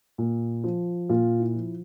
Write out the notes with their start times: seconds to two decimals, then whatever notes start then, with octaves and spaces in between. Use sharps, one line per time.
0.18 A#2
0.64 F3
1.09 A#2 F4
1.39 E4
1.55 F3